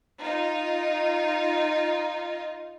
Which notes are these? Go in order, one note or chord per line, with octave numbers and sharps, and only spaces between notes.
D#4 F4